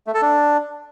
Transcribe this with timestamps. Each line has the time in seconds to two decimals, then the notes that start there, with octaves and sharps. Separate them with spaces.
0.07 A3
0.14 A4
0.22 D4